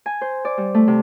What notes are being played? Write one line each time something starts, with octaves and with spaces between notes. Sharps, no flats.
G#5
C5
D5
G3
A3
C3